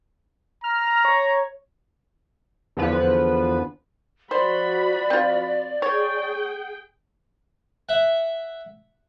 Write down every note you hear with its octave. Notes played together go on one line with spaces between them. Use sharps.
A#5 F6
C#5
E2 D3 F3 B4
F3 F#4 C5 D5 B5
C4 F4
G#4 C#5 G5
E5 F#5